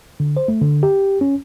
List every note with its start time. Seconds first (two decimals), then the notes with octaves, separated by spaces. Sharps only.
0.20 D3
0.37 C5
0.48 A3
0.61 D3
0.83 G4
1.21 C#4